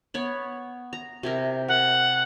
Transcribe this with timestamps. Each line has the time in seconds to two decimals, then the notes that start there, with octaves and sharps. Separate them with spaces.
0.14 B3 C#5 B5
0.93 A#5
1.23 C3 E4 A#4
1.68 A#4 F#5